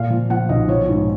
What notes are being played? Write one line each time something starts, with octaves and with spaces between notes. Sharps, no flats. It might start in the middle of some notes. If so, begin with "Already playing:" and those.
Already playing: A#2 F5
F3
F3 F#5
B1 D#5
F3 C#5
G#2